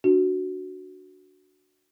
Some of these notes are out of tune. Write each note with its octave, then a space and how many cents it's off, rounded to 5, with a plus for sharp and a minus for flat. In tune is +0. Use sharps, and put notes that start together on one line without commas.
D4 +0 F#4 +0